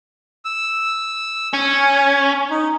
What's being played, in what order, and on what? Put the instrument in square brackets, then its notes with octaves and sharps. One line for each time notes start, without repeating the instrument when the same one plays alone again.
[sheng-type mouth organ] E6
[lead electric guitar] C#4 [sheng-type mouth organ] G#5
[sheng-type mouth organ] D#4